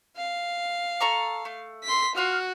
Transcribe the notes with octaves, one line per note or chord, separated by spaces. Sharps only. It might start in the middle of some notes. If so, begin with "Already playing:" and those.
F5
A4 A#5 C#6
A3
C6 B6
F4 F#4 F5 F6